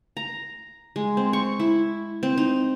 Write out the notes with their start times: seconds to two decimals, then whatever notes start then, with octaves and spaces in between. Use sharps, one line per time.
0.17 A#5
0.96 G#3
1.17 C4
1.33 C#6
1.60 E4
2.23 C4
2.37 D#4